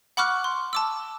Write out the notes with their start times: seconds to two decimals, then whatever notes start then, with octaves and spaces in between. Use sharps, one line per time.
0.17 F#5 B5 C#6 D6 F6 F#6
0.44 C6
0.73 A5 D6 E6